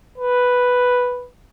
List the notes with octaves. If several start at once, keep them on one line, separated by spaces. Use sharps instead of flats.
B4